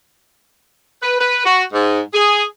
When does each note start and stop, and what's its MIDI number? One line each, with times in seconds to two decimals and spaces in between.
1.02 1.18 71
1.19 1.44 71
1.44 1.63 66
1.73 2.00 44
2.13 2.43 68